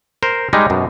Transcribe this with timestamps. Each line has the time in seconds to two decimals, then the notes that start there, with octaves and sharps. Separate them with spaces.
0.23 A#4 C5
0.53 G3 G#3 D#4
0.70 F#2 B2